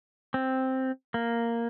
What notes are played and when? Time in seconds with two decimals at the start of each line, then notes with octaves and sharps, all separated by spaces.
0.34 C4
1.14 A#3